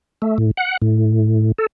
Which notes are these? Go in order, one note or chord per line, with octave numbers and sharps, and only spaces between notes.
A3
A2
F#5
A2
A4